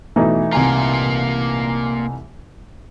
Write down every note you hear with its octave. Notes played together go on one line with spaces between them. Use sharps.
B2 E3 A3 D#4
C2 A#3 F4 G#5 A#5